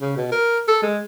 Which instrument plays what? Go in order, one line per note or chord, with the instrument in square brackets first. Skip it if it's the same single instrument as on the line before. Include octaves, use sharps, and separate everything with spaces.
[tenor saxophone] C#3
B2
A#4
A4
G#3